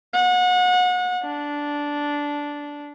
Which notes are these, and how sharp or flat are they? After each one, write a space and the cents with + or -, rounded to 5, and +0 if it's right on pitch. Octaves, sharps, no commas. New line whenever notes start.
F#5 -30
D4 -10